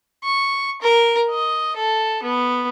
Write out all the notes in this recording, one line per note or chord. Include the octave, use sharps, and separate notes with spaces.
C#6
A#4
D#5
A4
B3